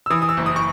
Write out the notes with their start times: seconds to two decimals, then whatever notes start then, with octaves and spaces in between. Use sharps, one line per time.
0.06 E6
0.10 E3 D#6
0.22 D#6
0.29 E6
0.37 F#1
0.46 D#6
0.56 C#6